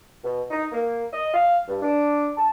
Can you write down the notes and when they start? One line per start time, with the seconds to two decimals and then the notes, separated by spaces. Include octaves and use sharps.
0.23 B2
0.50 D#4
0.72 A#3
1.12 D#5
1.34 F5
1.68 G2
1.82 D4
2.36 A5